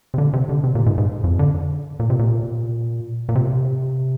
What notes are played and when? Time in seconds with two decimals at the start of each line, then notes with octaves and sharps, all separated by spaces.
0.14 C3
0.18 D3
0.33 C3
0.49 D3
0.64 C3
0.75 A#2
0.86 G#2
0.98 G#2
1.24 F2
1.39 D3
2.00 A#2
2.10 C3
2.19 A#2
3.29 A#2
3.35 C3